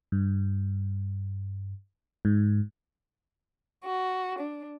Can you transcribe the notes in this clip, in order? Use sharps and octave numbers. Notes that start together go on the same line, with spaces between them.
G2
G#2
F#4
D4